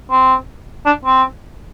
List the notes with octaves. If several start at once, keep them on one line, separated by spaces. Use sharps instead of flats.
C4
D4
C4